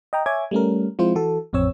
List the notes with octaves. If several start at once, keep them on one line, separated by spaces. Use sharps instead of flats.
D#5 G5 A#5
C#5 E5 G#5 D6 G#6
G3 A3 C#4 A#4
F3 G#3 C4 E4 F4 C5
E3 F#4 A4
A1 F2 C4 C#5 E6